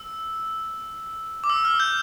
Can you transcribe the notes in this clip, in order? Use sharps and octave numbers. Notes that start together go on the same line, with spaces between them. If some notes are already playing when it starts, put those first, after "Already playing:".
Already playing: E6
D6
E6
F6
G6